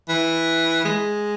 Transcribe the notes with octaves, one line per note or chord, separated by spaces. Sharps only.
E3
G#3